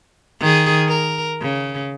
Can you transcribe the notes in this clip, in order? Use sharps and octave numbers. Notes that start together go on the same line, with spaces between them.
D#3 G#4
A#4
C#3